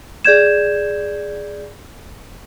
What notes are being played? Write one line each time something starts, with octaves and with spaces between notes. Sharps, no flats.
G#4 D5 G6 G#6 E7